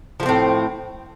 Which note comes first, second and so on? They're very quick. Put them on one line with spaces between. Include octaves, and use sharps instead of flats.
F3 A3 C4 A2